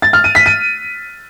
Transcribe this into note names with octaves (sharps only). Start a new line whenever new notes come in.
A6
F6
D#7
B6
D#7